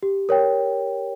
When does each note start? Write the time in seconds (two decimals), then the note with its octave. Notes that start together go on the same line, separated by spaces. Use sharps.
0.03 G4
0.29 A#4 C#5 G5